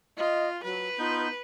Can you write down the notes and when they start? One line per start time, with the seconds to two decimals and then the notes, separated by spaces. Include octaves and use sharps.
0.18 F4 D#5
0.63 F#3 B4
0.99 B3 D#4 F4 G6